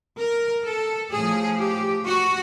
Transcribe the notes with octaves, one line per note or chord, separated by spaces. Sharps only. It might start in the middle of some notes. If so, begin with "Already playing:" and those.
A#4
A4
A2 F3 G#4
G4
F#4